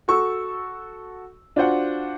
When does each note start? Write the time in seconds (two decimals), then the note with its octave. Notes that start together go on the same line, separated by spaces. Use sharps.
0.08 F#4 A4 C#6 E6
1.56 D4 F4 F#4 C5 F#5